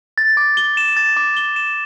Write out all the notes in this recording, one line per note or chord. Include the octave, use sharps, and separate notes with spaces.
A6
D6
G7
E7
A6
D6
G7
E7